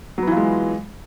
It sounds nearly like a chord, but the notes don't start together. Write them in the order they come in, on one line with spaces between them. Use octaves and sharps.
F#3 B3 E3 F4 G#3